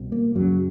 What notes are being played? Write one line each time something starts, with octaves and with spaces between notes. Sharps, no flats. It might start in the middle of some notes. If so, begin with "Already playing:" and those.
Already playing: C2 B2
A#3
F#2 C#3 F#3